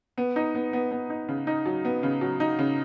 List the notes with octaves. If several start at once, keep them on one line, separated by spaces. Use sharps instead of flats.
B3
D#4
B3
B3
B3
D#4
C#3
D#4
F#3
B3
C#3
F#3
D#4
C#3